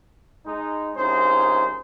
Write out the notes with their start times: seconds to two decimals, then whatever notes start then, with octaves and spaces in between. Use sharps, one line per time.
0.46 G#3 D#4
0.97 C2 A#2 C#4 D#4 G#4 C5